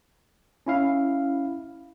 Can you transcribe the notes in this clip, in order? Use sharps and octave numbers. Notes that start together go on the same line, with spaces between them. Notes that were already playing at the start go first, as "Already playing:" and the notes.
C#4 E4 F5